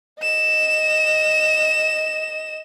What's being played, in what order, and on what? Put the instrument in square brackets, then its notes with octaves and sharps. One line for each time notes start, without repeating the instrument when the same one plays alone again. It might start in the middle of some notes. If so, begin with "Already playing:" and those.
[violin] D#5 E7